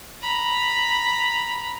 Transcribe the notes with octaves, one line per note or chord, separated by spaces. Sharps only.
A#5 B5